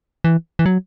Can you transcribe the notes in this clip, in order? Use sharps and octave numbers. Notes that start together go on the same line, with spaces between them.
E3
E3
F#3